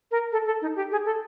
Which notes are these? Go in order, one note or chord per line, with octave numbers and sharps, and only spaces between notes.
A#4
A4
A4
D#4
G4
G#4
A4